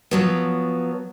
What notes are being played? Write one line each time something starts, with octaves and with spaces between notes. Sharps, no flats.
F3 F#3 B3